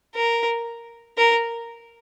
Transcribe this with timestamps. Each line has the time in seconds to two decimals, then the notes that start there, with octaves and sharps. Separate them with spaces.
0.15 A#4
1.18 A#4